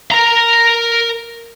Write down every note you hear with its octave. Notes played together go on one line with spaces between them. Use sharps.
A#4 A#5